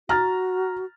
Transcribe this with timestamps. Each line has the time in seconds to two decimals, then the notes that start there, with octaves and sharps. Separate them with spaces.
0.09 F#4 A#5 F6 A6